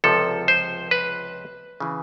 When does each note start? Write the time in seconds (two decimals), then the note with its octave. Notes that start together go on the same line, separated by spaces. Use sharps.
0.04 C#2 C3 F3 A4
0.48 C5
0.91 B4
1.80 C#3 E3